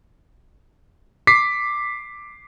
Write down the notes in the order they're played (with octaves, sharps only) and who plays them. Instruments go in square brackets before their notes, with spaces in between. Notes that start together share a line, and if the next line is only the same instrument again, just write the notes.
[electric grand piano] D6 B6 C7